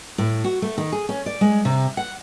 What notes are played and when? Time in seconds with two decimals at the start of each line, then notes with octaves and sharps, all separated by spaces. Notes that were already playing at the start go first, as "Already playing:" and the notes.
0.18 A2
0.44 F#4
0.62 A3
0.78 D#3
0.92 G#4
1.09 C#4
1.26 D5
1.41 G#3
1.65 C3
1.97 F#5